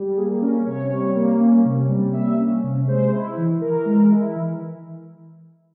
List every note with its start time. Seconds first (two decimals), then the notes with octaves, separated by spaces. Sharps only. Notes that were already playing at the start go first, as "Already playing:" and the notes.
Already playing: G3
0.17 A#3 G#4
0.42 C#4 A#4
0.66 C3 C#5
0.92 G3
1.16 A#3
1.40 C#4
1.65 C3
1.89 G3
2.13 A#3 E5
2.38 C#4
2.64 C3
2.87 G#3 C5
3.12 E4
3.37 E3
3.61 E3 A#4
3.86 G#3
4.11 E4
4.36 E3